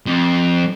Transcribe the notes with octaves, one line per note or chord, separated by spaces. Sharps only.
F2